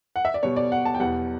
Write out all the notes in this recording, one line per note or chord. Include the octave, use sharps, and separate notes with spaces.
F#5
E5
D5
B2 G3 C#5
D5
F#5
A5
G5
E2 B2 G3 F#5